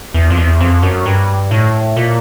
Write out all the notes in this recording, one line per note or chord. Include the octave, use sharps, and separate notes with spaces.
E2
F2
E2
F2
F#2
G2
A2
A#2